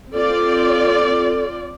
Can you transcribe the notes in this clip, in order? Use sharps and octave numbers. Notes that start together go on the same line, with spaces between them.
C4 F4 A4 D5